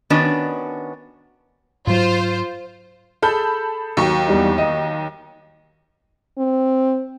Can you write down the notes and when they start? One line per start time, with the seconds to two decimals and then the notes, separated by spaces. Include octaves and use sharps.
0.10 D#3 B3 C#4 D4 F#4
1.87 G#2 F#3 F4 C5
3.22 G#4 A4 A5 B5 G6
3.97 D#2 F#3 C#6
4.28 E2 G3 D#4
4.58 D#5
6.38 C4